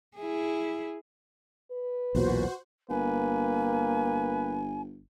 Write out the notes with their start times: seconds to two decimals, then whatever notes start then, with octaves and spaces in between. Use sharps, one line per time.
0.18 E4 G#4
1.71 B4
2.15 B1 E2 A#2 F#4 C5
2.90 G1 A#3 B4 G#5